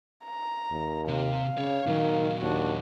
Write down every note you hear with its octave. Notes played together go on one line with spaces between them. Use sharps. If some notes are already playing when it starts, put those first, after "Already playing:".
A#5
D#2
C3 F5
C#3 C#5 D5
A#2 D#3 F#3
D#2 D4 F#4